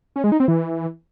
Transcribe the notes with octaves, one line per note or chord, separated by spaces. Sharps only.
C#4
G#3
D#4
C4
E3